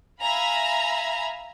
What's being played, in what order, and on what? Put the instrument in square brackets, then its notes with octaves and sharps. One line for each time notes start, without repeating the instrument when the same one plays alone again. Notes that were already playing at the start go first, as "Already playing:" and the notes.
[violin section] E5 F5 G#5 A#5 B5